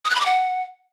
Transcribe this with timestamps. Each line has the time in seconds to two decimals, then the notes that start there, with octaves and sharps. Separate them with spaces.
0.05 D#6
0.10 F#6
0.15 B5
0.20 D6
0.26 F#5